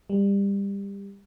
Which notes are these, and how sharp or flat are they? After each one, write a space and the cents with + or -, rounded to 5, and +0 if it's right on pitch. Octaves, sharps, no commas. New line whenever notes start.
G3 +25